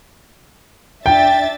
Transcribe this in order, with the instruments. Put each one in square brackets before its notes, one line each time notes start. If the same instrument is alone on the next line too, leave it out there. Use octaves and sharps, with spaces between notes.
[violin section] D4 E5 A6 [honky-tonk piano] G5